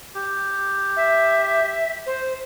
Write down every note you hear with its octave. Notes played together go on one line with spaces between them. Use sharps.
G4
E5
C5